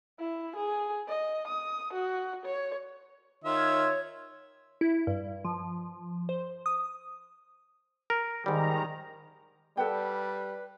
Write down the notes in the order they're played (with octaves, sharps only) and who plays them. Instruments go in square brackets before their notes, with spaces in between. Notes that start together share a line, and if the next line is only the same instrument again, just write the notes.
[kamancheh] E4
G#4
D#5
D#6
F#4
C#5
[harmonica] D#3 F4 E5 [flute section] C#5
[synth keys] E4
G2
F3
C5
D#6
[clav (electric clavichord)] A#4
[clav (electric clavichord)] G#2 G3 [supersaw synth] D#3 A#5
[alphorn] G3 [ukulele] A4 F#5 G5 [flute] B4